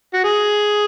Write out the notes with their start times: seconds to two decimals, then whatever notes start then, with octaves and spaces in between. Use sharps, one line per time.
0.13 F#4
0.24 G#4